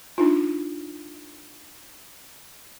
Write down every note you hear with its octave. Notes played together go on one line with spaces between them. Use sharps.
D4 D#4 F4